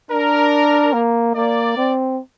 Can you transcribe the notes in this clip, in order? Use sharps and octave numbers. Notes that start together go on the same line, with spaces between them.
D4 A#4
A#3
A#3 D5
C4